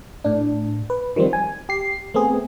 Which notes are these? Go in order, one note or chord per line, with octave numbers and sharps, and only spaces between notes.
A2 D4
B4
D#3 F3 G3 C4
G#5
G4 C7
A3 B3 C4 G#4